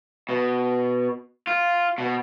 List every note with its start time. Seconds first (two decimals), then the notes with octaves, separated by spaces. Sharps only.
0.29 B2
1.47 F4
1.98 B2